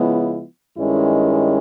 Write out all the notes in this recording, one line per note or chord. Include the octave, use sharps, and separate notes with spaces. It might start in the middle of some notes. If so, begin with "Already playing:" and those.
Already playing: C#3 F3 G#3 B3 E4
G2 D#3 G#3 C#4 E4